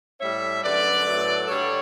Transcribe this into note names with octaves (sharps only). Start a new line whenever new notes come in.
A2 G3 C#5 E5
F#2 D3 A3 B4 D5
A2 F#3 A3
G2 D3 G3 A4 C#5